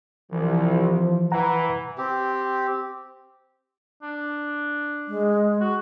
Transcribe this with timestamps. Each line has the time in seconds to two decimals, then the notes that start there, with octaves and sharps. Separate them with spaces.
0.32 C2 E3 F3
1.32 E3 B4 F#5 A#5
1.98 C4 G4
4.02 D4
5.08 G#3
5.60 F#4